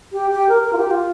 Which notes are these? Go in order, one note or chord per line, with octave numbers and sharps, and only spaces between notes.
G4
G4
A#4
A#4
F4
G4
F4